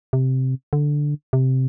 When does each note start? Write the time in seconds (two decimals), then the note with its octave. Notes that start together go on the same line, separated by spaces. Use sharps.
0.13 C3
0.73 D3
1.33 C3